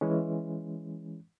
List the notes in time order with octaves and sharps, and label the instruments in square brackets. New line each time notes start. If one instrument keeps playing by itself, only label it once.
[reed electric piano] E3 G#3 C#4